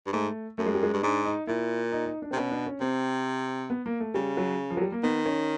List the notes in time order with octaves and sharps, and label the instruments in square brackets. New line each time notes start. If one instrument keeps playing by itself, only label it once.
[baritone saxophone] G2
[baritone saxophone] G#2 [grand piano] A3
[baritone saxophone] F#2 [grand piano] A3
[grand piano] G#3
G3
G#3
[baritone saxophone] G2
[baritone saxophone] G#2 [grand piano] D4
[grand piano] D#4
[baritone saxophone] A#2 [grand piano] E4
[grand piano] D#4
D#4
D4
[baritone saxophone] C3 [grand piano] C4
[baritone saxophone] B2 [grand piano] C#4
[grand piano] D4
C#4
[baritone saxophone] C3 [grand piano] C4
[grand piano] B3
A#3
A3
[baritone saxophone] C#3 [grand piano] G3
[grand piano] F#3
F3
F#3
G3
A#3
[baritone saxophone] D#3 [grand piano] B3
[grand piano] C#4